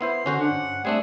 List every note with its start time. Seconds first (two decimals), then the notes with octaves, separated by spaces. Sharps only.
0.01 B3 E4 C5 C6
0.26 D3 C#4 F#4 C5
0.40 D4 F#5
0.51 G2
0.85 G3 A3 C4 D4 G#4